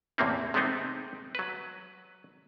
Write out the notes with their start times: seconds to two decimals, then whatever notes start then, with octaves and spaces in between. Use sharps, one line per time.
0.18 E2 A2 C3 A#3 C4 C#4
0.54 C3 G#3 A3 B3 C4 D#4
1.35 F#3 B4